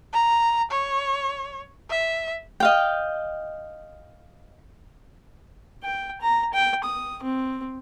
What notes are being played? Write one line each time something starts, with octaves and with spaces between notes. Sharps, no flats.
A#5
C#5
E5
D#5 F5 G5
G5
A#5
G5
D#6
C4